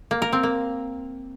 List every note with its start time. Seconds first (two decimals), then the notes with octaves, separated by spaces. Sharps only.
0.11 A#3
0.22 A#4
0.33 C4
0.43 A#3